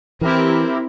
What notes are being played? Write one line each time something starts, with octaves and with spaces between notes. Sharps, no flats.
E3 C4 E4 G4 A#4